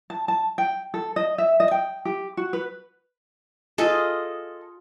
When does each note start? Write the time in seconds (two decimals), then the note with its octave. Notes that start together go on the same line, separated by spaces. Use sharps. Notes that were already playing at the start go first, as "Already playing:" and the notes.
0.10 A5
0.28 A5
0.58 G5
0.94 A4
1.16 D#5
1.38 E5
1.60 D#5
1.71 G5
2.05 G4
2.37 F#4
2.53 B4
3.78 F4 G#4 A4 D#5